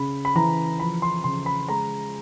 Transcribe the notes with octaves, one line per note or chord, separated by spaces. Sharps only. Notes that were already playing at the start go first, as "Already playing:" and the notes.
Already playing: C#3 B5
B5
E3 A#5
F3 B5
C6
C#3 C6
B5
G#3 A#5